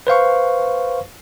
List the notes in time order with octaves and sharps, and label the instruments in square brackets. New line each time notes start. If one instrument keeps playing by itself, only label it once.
[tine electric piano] B4 C5 F5 C#6